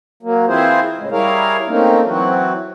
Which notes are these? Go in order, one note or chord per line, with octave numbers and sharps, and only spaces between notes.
F#3 A#3
E3 C4 E4 F4 G#4 C5
A2 C#3 G#3
G3 E4 G#4 A#4 C#5 F5
A3 A#3 C4 C#4 D#4
E3 F#3 C4 F#4